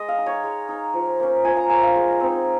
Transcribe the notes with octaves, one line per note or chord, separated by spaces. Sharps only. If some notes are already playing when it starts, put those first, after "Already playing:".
Already playing: G#3 D#5
F5
D#4
C#5
G#3
D#4
F3
A#3 C#4
F3 G#5
A#5
A#3 C#4 G#5
F5
G#3
C4 D#4